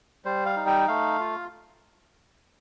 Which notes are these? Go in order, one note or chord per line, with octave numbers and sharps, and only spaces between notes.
G3 C5
F5
D#4
G5
A3 F5
F4